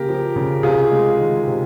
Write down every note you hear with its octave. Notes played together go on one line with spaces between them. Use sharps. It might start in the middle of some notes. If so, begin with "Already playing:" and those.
Already playing: C#3 A#3 G4 A#4
F3
C#3
C3 F4 G#4
G#3
D#3
C3